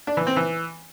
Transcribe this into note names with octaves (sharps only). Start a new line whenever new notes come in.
D4
E3
C4
E3